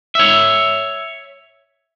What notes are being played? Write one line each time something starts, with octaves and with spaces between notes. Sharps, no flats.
C#5 E5